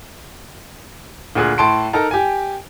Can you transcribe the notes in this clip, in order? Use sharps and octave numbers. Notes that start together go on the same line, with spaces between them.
D2 A#2 G#4 F#6
A2 A5 C6 D7
D#4 A4 A#4 A#5
G4 G#5